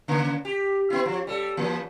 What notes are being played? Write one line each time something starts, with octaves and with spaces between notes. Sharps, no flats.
C#3 A#3
G4
B3 E4
F3
G3 A4
E3 A#3